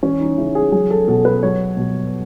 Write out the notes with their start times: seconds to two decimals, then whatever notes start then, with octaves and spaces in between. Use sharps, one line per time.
0.03 E3 C#4
0.21 D#4
0.37 C#3 E4
0.55 G#4
0.72 F#3 G#4
0.91 A4
1.08 B2 A4
1.25 B4
1.43 F#3 C#5
1.77 B2